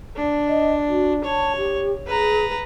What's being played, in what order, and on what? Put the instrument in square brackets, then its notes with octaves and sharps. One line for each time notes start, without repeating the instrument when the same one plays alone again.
[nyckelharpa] D4
[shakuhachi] D#5
F#4
[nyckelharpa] C#5 [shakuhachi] A5
[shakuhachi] G4
[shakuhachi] G#4 [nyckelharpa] B4 A#5